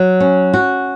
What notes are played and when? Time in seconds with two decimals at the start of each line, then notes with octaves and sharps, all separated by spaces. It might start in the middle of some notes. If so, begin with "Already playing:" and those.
Already playing: F#3
0.20 C#4
0.54 F#4